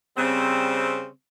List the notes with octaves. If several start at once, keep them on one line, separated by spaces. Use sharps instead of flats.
C#3 G3 C4